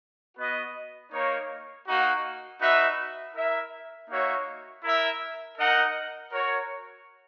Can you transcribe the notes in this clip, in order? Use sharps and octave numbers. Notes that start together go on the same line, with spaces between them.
B3 F#4 B4 D#5
A#3 D#4 A#4 C#5
A#3 D#4 F#4
D#4 F#4 B4 E5
E4 A#4 E5
A#3 D#4 F#4 C#5 E5
E4 A#4 E5
D#4 A#4 D#5 F#5
F#4 A#4 C#5